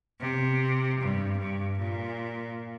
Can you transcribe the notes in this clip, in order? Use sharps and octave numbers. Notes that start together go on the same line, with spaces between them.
C3
G2
G2
A#2